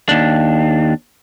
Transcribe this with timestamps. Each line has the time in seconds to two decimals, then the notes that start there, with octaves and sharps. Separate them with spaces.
0.09 D#2 D4